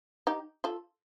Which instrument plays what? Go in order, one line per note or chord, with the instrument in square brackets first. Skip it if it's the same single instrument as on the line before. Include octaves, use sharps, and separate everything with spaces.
[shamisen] D#4 G4
F4 A4